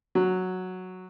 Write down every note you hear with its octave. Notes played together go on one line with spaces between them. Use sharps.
F#3